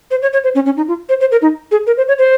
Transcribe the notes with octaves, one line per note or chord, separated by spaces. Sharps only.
C5
C#5
C#5
C5
C#4
C#4
D#4
F4
C5
C5
A#4
D#4
G#4
A#4
C5
C#5
C5